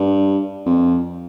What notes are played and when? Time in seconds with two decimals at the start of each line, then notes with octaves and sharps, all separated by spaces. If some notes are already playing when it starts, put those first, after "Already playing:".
Already playing: G2
0.66 F2